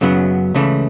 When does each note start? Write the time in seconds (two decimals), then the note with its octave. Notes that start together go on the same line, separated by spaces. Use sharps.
0.01 F#2 C#3 F#3 B3
0.54 C#2 C#3 E3 A3 E4